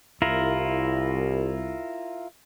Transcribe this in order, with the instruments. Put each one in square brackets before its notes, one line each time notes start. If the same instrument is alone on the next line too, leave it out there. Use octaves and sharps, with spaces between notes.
[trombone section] C2 [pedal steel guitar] E4 F4 A#4